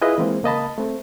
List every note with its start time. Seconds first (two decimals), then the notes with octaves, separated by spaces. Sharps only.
0.02 E4 F4 G#4 B4 D#5 E5
0.18 E3 G#3 A#3 C4
0.43 C#2 A#3 D#5 A5 B5
0.78 A3 C4